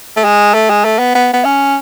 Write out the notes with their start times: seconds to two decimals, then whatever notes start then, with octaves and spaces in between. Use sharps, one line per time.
0.17 A3
0.24 G#3
0.54 A3
0.70 G#3
0.85 A3
0.99 B3
1.15 B3
1.33 B3
1.44 C#4